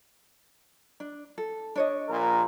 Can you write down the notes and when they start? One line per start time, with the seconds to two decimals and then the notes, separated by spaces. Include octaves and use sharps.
1.00 D4
1.38 A4
1.75 D4 C#5 D#5
2.09 A#1 A#2 A#4